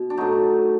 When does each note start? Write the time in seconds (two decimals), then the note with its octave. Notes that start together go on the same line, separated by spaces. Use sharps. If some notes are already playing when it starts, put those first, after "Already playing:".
Already playing: B2
0.10 D4
0.17 A2 F#3 D#4